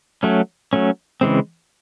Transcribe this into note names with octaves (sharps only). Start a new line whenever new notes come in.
F#3 A3 C#4
F#3 A3 C#4
C#3 E3 G#3 C4